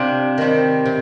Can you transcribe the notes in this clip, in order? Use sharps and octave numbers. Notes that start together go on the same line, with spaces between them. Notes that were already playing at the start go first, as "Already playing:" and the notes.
Already playing: C3 D4 F4 G4
D#3 G3 C4
C3